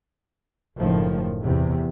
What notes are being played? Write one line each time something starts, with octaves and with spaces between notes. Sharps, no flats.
F#1 A2 D#3 F3
E2 C3